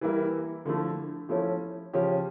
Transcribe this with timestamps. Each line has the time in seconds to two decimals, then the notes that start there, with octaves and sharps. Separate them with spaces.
0.01 E3 G3 A#3 E4 A#4
0.65 D3 F3 A3 E4
1.29 F3 A3 C#4 E4
1.93 C#3 F3 C#4 G4